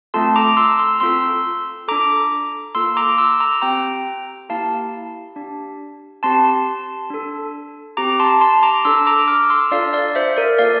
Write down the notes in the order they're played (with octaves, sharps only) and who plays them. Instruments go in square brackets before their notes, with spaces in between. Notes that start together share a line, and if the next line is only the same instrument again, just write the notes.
[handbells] A3 C4 F4 A4 A5 C6
A#5 D6
C6 E6
C6 E6
C4 F4 A4 C6 E6
D4 A4 A#5 D6
A#3 F4 A4 C6 E6
A#5 D6
C6 E6
A#5 D6
C4 G4 G5 A#5
A#3 E4 G4 F5 A5
D4 G4
C4 G4 A5 C6
D4 A4
C4 G4 A#5 D6
A5 C6
A5 C6
A#5 D6
D4 A4 C6 E6
A#5 D6
D6 F6
C6 E6
D4 F4 A4 D5 F5
D5 F5
C5 E5
A#4 D5
A#3 F4 A4 D5 F5